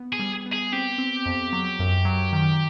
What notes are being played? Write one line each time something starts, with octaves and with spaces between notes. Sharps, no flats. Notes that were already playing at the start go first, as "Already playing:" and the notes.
Already playing: B3
G#4
G3
B3
G#4
C4 G4
C4
F2
F#3
F#2
F#3
D#3